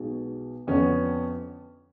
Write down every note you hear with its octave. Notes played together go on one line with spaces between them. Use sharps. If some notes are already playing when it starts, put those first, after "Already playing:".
Already playing: B1 B2 G#3
F2 D3 F3 B3 C#4